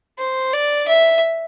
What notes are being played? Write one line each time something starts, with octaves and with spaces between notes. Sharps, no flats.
C5
D5
E5